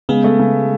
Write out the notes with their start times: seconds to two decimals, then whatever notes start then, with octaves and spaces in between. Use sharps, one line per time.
0.09 C#3 G#3 B3
0.24 A3
0.39 C#3